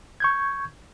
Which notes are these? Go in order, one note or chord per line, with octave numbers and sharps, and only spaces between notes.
C#6 G6 G#6